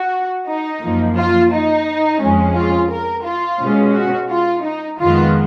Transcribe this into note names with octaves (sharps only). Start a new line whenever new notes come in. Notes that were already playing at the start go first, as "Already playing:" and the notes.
Already playing: F#4
D#4
F#2 F3 A#3
F4
D#4
F2 F3 G#3 C#4
F4
A#4
F4
B2 G#3 C#4
F#4
F4
D#4
F2 D#3 G#3 B3 F4